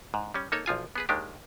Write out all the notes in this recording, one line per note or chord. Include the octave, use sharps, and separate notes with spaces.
G#2
G3 C#4
A#3 D#4 A4 C#5
B1 F3 F4 G#5
B3 G#4 B4
D#2 D#3 G#3 D4 G4